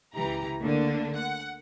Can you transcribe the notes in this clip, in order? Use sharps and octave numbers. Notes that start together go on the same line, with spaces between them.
C#2 E3 G4 A#5
D3 A3 A#3 D4
F#5